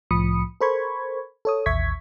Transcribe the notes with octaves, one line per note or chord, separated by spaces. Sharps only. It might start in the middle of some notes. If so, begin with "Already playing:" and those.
C2 A2 F3 B5 D#6 C#7
A4 A#4 C5 B5 C#6 G#6
A4 C#5 D#6
A1 D#2 E5 C#6 G#6 B6